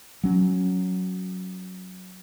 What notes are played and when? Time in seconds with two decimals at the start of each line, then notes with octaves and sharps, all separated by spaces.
0.23 F#3 C#4